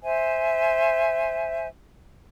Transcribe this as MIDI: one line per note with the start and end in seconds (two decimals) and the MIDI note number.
0.03 1.67 72
0.03 1.67 76
0.03 1.67 80